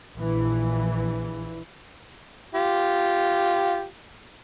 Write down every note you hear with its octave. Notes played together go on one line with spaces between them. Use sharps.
A#1 E3
F4 G4